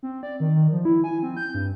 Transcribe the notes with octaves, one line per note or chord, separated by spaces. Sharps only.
C4
D5
D#3
D#3
F3
E4
G#5
C4
G6
G2